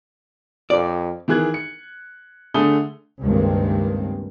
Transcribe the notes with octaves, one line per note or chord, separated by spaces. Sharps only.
F2 D5
D#3 E3 G#4 F#6 G#6
C#7
D3 A3 G#4 A4 D#6 G7
C#2 G2 D#3 G#3 A#3 C4